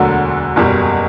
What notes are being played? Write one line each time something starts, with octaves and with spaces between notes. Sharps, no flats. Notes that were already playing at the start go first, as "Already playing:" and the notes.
Already playing: E1 D2 D3 F#3
F#1 E2 B2 G3